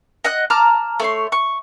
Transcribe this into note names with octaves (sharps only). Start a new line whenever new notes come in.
D#5 F#5 F#6
A5 A#5 D6 F6
A3 C#5 C6
C#6